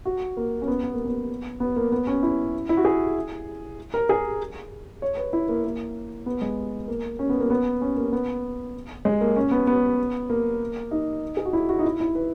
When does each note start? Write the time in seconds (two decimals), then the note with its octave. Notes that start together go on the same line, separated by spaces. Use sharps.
0.05 F#4
0.37 A#3
0.62 C#4
0.67 B3
0.83 B3
0.94 A#3
1.05 B3
1.60 B3
1.76 A#3
1.92 B3
2.07 C#4
2.23 E4
2.69 E4
2.77 F#4
2.85 G#4
3.94 A#4
4.09 G#4
5.02 C#5
5.17 B4
5.33 E4
5.48 A#3
5.64 A#3
6.26 B3
6.42 G#3
6.88 A#3
7.19 C#4
7.29 B3
7.40 A#3
7.50 B3
7.81 C#4
7.96 A#3
8.12 B3
9.05 G#3
9.21 A#3
9.36 C#4
9.51 B3
9.67 B3
10.30 A#3
10.91 D#4
11.37 G#4
11.45 F#4
11.53 E4
11.69 F#4
11.79 D#4
11.85 E4
12.00 E4
12.15 B4